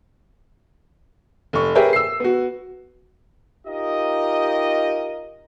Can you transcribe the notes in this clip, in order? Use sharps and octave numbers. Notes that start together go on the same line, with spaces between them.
F1 C#6
G4 G#4 A#4 B4 C#5 E5
E6 C7
B3 F#4
D#4 F4 G4 A#4 D#5